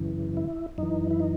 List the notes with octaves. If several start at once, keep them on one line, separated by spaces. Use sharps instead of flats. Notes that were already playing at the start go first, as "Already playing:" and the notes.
Already playing: F#2 C#3 E3
E4
F#2 E3 D#4
E4
D#4